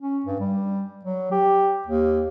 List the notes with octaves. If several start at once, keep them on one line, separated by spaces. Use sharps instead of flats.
C#4
G2
G3
F#3
G4
D#2